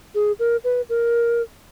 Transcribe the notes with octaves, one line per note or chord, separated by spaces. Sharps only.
G#4
A#4
B4
A#4